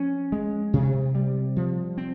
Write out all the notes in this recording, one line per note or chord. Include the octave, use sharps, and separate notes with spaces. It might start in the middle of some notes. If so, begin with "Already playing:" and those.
Already playing: F3 C#4
G#3
C3
G3
F3
C4